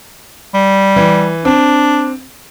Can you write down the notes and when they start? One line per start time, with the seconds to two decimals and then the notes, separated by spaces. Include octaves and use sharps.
0.54 G3
0.96 E3
1.45 C4 D4